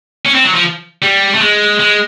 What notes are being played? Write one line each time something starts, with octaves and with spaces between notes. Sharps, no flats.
C#4
C4
F#3
F3
G3
A3
G#3
G#3